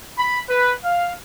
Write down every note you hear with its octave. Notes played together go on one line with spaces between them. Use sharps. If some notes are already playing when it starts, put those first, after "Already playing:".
B5
B4
F5